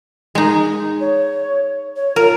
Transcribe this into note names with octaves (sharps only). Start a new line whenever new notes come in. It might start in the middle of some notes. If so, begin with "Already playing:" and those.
G#3 D#4
C#5
C#5
F4 A#4